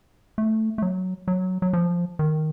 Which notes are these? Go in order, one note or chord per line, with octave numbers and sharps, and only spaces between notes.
A3
A3
F#3
F#3
F#3
F3
D#3